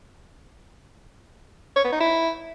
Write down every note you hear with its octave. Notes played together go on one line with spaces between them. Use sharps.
C#5
B3
D#4
E4